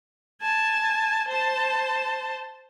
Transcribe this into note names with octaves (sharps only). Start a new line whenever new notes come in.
G#5 A5
C5 A5